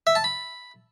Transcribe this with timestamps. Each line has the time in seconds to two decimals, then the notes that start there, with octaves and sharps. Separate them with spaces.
0.07 E5
0.15 A5
0.24 B5